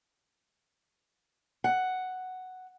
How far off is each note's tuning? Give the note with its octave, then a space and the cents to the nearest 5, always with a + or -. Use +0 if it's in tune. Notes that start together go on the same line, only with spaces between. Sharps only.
F#5 +5